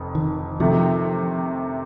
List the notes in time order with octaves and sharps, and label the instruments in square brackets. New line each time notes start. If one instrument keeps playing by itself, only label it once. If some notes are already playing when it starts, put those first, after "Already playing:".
Already playing: [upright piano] F1 F2
[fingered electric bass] D#3
[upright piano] C3 D#3 A3 [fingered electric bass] F3